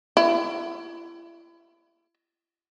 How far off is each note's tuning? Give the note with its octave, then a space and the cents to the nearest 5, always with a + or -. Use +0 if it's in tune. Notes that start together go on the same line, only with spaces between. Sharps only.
E4 +40